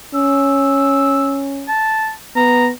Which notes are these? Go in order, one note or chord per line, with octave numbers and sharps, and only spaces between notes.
C#4 E6
A5
B3 A#5